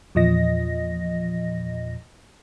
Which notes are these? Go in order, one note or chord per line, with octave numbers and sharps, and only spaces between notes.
E2 A#2 F3 D#5 A#6